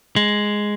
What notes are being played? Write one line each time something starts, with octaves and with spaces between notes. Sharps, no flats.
G#3